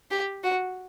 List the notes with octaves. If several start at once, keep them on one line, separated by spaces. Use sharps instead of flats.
G4
F#4